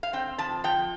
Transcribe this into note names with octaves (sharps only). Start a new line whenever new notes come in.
F5
C4 G5
F3 A5
F3 G5